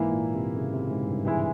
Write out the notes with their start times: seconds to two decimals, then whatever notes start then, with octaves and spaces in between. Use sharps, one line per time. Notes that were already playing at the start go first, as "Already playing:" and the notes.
Already playing: G#2 E3 A#3 E4
0.11 A#2
0.34 C3
0.56 C#3
0.74 C3
0.91 G#2
1.08 G2
1.25 E3 G#3 E4